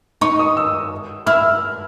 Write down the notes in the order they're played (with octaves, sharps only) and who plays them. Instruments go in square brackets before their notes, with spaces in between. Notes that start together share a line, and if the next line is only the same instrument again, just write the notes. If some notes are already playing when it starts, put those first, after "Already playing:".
[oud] D#4 [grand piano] C#6
[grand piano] D#6
E6
[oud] E4 [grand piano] F6